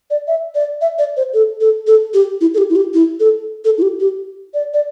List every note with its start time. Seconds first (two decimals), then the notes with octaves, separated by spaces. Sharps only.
0.11 D5
0.28 E5
0.55 D5
0.81 E5
0.98 D5
1.17 C5
1.34 A4
1.61 A4
1.87 A4
2.14 G4
2.41 E4
2.54 A4
2.58 G4
2.70 E4
2.76 G4
2.94 E4
3.20 A4
3.65 A4
3.78 E4
3.82 G4
4.00 G4
4.54 D5
4.74 D5